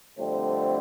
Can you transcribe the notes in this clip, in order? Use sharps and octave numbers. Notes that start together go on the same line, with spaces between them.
F2 D3 G3 A3 C4